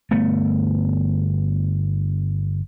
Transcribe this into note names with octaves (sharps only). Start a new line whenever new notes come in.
G1 A3 B3